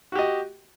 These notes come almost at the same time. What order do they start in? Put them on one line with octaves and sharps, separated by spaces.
F#4 G4 D#5